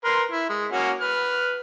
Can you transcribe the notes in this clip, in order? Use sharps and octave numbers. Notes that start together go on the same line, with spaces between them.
A#4 B4 C6
E4
G#3
A#3 C#4 F#4
B4 F6